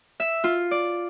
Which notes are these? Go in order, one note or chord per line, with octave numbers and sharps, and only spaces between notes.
E5
F4
D5